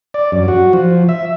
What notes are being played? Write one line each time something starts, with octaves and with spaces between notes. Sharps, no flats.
D5
F#2
F#4
F3
E5